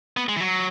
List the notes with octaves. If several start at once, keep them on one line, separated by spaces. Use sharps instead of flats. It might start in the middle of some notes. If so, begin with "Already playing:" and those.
B3
G#3
E3
F#3